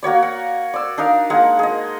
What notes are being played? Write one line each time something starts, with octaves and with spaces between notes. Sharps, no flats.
A#3 F#4 C#5 D5
F#5
D5 E6
D4 D#4 A#4 F5
G#3 A#3 F#5
G#4 D#5